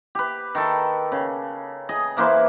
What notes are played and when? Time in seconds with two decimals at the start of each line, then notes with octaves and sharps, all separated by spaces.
0.15 G4 B4
0.55 D#3 A4
1.12 C#3
1.89 G#4 D#5
2.17 E3 A#3 B4 C5